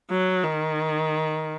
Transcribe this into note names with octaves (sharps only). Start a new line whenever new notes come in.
F#3
D#3